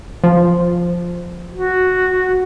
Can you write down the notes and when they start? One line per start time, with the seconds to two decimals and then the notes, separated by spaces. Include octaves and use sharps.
0.24 F3
1.53 F#4